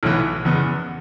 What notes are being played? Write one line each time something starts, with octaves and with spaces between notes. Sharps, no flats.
B1 A2 E3 B3
F#1 E2 E3 B3